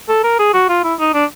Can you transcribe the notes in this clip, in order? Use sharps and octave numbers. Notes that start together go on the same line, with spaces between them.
A4
A#4
G#4
F#4
F4
E4
D#4
D4